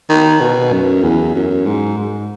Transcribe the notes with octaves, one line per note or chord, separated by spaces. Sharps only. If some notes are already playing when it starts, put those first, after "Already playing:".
D#3
B2
F#2
E2
F#2
G#2
G#2